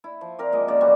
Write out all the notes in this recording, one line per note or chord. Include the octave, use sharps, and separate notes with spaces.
E4
F3
C4 A#4 D5
A#2 G#3 D#5
C#3 D5
B2 E3 G3 F#4